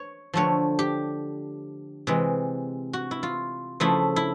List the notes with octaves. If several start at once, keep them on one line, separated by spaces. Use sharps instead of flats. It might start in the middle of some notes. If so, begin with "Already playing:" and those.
Already playing: C#5
D3 F3 A3 C#5
G4
C3 E3 G#3
F#4
E4
F4
C#3 F3 A3 E4
E4